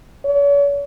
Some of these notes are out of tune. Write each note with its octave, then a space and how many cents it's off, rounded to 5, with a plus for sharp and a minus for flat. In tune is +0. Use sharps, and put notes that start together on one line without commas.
C#5 +45